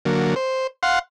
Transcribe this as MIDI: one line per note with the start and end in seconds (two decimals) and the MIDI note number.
0.05 0.35 50
0.05 0.35 54
0.05 0.35 58
0.36 0.67 72
0.83 0.99 77
0.83 0.99 78
0.83 0.99 84